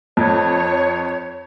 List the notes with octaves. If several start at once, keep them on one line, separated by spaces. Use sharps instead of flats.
F2 C#5